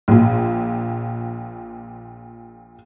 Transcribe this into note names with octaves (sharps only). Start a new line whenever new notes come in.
A#1 A#2